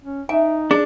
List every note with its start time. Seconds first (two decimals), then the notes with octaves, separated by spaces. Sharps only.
0.04 C#4
0.29 D#4 E5 G#5
0.71 D4 G#4